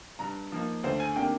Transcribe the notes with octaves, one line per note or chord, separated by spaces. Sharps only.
G2 A#5
F3 A#3 D#4
D2 C5
G#5
C3 D#3 A#3 D4 G5